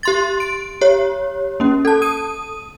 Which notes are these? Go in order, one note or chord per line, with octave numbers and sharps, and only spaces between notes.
G4 C6 A6
D7
G4 C#5
A#3 C#4
A4 A5
D#6 D#7